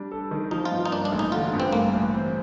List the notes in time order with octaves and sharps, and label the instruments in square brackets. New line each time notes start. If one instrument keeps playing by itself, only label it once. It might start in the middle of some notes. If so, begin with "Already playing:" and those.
Already playing: [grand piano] G3 D4
A4
D#3
[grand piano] F3 [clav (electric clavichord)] D#4
[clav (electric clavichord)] F4
[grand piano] G2
[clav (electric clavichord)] D#4
[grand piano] A#3 [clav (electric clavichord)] D4
[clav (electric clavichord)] D4
[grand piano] A1
[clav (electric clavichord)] D#4
[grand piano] D3 [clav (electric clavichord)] F4
[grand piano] G2
[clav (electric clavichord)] C4
[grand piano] A3 [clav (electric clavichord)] A#3
[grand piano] A1
C4